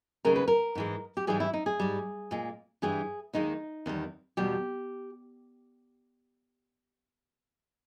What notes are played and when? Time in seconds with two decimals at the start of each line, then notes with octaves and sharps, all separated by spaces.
0.25 D#2 C#3 G#3 A#4
0.36 B4
0.48 A#4
0.75 G#2 E3 G#3
1.17 G4
1.27 G#2 E3 G3 G#4
1.40 E4
1.54 D#4
1.66 G#4
1.80 G#2 G3
2.31 A#2 G#3
2.82 G2 E3 G3 G#4
3.33 D#2 D#3 G#3 D#4
3.86 E2 D#3 G3
4.37 E2 B2 G3 G4